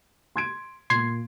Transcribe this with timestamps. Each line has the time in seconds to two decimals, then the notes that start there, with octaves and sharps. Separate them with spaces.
0.36 C6 G#6 D7
0.90 A#2 A#3 C6 G#6 C7